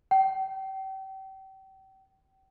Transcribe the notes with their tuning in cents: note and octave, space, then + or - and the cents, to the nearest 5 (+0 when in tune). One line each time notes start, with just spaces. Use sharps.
G5 -35